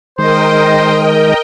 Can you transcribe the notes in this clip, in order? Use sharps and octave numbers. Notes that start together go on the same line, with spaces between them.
D#3 G#3 A#4 C5 D#5 G5